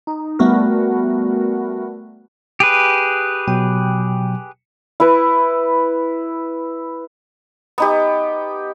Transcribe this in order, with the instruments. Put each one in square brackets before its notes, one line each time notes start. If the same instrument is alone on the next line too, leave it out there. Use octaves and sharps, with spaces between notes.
[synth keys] D#4
G3 A3 B3 F#4 A#4
[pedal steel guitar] G4 G#4 B4
[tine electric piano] B2 F#3 G5
[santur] E4 B4
B3 D#4 G4